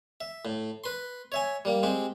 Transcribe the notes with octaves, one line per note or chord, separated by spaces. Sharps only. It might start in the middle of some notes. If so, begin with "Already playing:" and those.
E5
A2
B4 C6
C#5 E5 G#5
G3 A#3
G#3 C4 G4